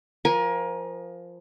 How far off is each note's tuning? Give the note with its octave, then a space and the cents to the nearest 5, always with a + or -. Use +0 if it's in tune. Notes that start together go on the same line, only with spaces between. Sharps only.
F3 +0 A#4 +25 G#5 -10